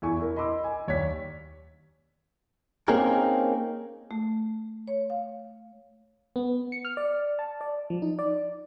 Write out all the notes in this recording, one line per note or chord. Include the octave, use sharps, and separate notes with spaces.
E2 E4 G#5 C#6
E4 A#4
D#5 B5 C6 D6 E6
G#5
D#2 C#5 D5 C#6 B6
A#3 C4 C#4 D#4 G#4 A#4
A3
C#5
F5
B3
C#7
F6
D5
A5
D5
F3
D#4
D5